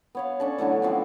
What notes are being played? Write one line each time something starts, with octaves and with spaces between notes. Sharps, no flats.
B3 C#5 F5
C#4 D4 A4
D3 E3 F#3 A3
F3 B3 C4